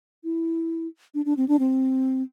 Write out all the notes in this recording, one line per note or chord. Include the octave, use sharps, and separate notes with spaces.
E4
D4
D4
C4
D4
C4